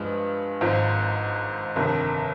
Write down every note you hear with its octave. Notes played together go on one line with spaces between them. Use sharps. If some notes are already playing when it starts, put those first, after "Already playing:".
Already playing: G2 F3 G#3
G#1 G#2 F3 C4
G1 F2 C3 D#3